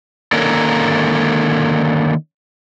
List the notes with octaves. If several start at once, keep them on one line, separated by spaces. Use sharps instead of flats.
D3 D#3 A#3 C#4 A4 A#4